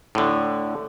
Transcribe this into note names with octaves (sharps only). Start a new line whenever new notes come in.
A2 D3